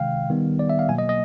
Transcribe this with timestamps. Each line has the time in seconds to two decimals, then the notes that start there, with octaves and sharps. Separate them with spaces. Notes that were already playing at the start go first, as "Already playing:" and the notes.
Already playing: C3 D#3 G#3 F5 G5
0.29 D#3 G3 B3
0.59 D5
0.70 E5
0.79 F5
0.89 B2 F#3 A#3 G#5
0.98 D#5
1.09 D#5